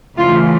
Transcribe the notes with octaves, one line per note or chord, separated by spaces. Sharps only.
C#3 E3 A3 F4